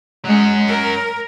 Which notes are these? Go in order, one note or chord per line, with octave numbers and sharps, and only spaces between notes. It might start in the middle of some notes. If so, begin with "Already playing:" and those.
F#3 G#3 C#4
A#4